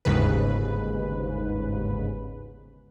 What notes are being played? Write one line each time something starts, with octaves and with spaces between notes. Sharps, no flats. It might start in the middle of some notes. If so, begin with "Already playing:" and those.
G1 D#2 G#2 C#3 B4